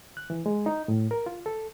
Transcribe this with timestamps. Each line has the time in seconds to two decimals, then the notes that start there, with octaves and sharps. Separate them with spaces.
0.17 F#6
0.30 E3
0.46 G#3
0.66 D#4
0.88 A2
1.11 A#4
1.26 F4
1.46 A4